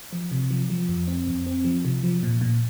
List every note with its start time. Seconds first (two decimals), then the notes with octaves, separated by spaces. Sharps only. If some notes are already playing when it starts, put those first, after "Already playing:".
0.13 F3
0.31 C3
0.51 F3
0.70 F3
0.89 F2
1.08 C4
1.27 F2
1.46 C4
1.65 F3
1.85 C3
2.03 F3
2.23 A#2
2.41 A#2